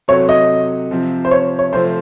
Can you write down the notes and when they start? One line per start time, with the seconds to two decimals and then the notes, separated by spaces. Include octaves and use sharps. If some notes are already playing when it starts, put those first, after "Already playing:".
0.08 C3 F#3 C4 F#4 A4 C#5
0.29 D#5
0.91 C3 F3 C4
1.25 C5
1.31 C#5
1.59 C#5
1.73 C3 F3 A3 C4 C5